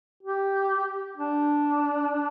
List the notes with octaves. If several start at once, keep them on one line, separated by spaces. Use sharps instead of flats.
G4
D4